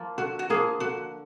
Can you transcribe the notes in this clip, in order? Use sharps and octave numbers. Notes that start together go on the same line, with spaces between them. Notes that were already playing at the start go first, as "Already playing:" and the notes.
Already playing: F3 A#3
D3 F#4
F#4
F3 A#3 G#4
D3 F#4